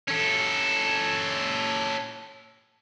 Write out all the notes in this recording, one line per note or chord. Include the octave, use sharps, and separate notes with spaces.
C#4 A4